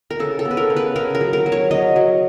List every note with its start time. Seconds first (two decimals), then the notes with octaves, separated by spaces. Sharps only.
0.11 A#4
0.20 C#3 A4
0.39 A4
0.45 B3
0.51 B4
0.57 A#4
0.70 C#3
0.76 B4
0.96 C#3 A#4
1.15 A#4
1.21 F#3
1.33 A#4
1.46 F#3
1.52 C#5
1.71 F#3 D#5
1.96 F#3